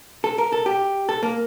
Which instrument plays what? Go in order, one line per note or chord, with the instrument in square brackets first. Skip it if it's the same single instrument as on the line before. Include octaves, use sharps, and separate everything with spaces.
[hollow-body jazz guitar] A4
A#4
A4
G4
A4
A#3